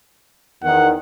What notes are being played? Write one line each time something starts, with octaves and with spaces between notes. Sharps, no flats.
E2 D#3 F#5